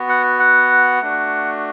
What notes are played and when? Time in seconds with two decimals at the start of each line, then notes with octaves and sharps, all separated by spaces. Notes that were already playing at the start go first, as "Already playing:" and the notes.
Already playing: B3 F#4
0.09 F#5
0.39 F#5
1.01 A3 D4 F#4